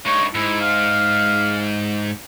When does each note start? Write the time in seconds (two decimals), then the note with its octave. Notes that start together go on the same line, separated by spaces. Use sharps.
0.06 G2 D#4 C#5
0.35 G#2 E4
0.61 F5